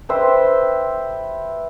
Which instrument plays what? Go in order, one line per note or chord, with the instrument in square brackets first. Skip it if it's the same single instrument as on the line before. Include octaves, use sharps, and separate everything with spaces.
[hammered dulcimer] G4 B4 C5 E5